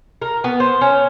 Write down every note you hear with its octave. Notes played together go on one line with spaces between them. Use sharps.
A#4
B3
C5
C#4